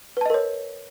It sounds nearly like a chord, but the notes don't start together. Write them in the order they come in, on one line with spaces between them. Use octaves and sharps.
B4 A5 D#5 A#4 C#5